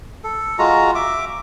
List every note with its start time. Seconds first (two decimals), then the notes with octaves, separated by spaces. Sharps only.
0.24 A4
0.59 G#3 F4 F#4 A#5
0.95 E5 D6